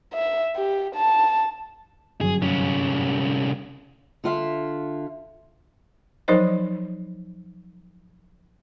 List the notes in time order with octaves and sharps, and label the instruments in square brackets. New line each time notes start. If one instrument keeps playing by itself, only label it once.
[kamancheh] E5
G4
A5
[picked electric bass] G1 F#2 F#3 [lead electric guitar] G#4
[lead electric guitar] C2 C#4
[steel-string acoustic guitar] D3 F4 E5
[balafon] F3 F#3 D#4 A#4 C5 D#5